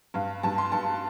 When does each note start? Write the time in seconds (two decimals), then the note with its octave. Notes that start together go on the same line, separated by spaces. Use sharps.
0.14 G2 F5
0.43 G2 A5
0.58 C6
0.72 G2 A5